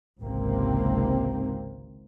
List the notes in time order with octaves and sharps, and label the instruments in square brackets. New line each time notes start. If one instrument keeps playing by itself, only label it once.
[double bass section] G#1 C#2 C3 A#3 C4